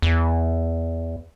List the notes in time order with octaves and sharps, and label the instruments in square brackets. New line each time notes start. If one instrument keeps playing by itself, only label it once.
[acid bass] E2